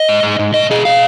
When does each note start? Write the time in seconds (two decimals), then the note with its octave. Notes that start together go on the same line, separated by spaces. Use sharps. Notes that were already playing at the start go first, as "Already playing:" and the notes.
Already playing: D#5
0.09 G#2
0.23 G#2
0.39 G#2
0.54 B2 D#5
0.70 B2 G#4
0.85 B2 F5